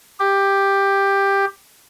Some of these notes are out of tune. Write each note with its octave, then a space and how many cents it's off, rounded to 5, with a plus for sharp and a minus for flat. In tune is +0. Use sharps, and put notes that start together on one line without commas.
G4 +10